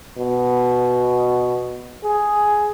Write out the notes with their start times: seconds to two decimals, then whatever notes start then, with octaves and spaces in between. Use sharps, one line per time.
0.17 B2
2.04 G#4